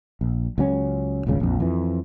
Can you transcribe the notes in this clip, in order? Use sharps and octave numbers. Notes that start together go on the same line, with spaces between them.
A#1
C#2 F#3 C#4
D#1 G#1 C#2 C#3
A#1 F2
F2 E3